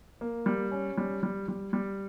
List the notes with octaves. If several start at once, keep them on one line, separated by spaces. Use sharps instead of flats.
A#3
G3
C#4
G3
G3
G3
G3